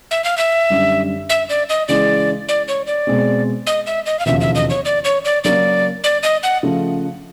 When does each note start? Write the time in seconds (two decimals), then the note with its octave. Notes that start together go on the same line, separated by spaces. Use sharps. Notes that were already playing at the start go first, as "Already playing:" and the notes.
0.11 E5
0.24 F5
0.38 E5
0.70 F#2 D3 G3
1.29 E5
1.49 D5
1.69 D#5
1.88 C#3 E3 G#3 D5
2.49 D5
2.68 C#5
2.87 D5
3.07 B2 G#3 C4
3.67 D#5
3.87 E5
4.06 D#5
4.19 F5
4.26 E1 D#2 C#3 F3 E5
4.41 E5
4.55 D#5
4.70 C#5
4.85 D5
5.05 C#5
5.25 D5
5.44 C#3 F#3 A#3 C#4 D5
6.04 D5
6.23 D#5
6.43 F#5
6.63 C#3 F3 A3